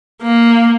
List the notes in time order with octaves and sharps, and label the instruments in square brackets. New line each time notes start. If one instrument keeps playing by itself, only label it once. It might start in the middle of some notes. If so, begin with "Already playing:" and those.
[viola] A#3